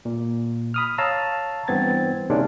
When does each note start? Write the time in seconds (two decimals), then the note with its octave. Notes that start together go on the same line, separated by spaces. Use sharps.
0.05 A#2
0.74 B5 D#6 F6
0.98 C#5 F5 A5 A#5 E6
1.68 G2 E3 B3 C4 G#6 A6
2.30 C3 D#3 G#3 A#3 C#4 D4